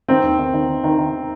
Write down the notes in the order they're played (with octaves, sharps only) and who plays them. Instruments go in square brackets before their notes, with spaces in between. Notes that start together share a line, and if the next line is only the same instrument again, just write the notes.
[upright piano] D#3 C4
D#2
D#3
D#3
D#3
D#3
D#3